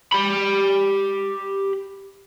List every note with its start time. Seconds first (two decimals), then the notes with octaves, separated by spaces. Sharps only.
0.13 G4 B5